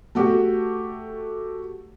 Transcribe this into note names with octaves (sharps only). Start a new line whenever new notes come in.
A3 F#4 G4